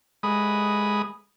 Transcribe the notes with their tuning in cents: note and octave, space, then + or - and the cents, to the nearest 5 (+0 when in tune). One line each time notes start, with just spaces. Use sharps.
G#3 +0 B5 +0 D#6 +0